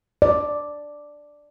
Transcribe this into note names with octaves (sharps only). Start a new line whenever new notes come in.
D5